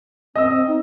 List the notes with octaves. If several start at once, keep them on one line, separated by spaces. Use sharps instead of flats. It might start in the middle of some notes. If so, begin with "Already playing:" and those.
C4 D#5 E6
C4
D#4